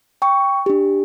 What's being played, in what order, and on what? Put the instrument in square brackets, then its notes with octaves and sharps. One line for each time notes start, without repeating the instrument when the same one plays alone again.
[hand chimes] G5 C#6
D4 G4